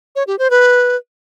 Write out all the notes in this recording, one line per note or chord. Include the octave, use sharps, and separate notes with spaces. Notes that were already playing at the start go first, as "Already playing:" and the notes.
C#5
G4
C5
B4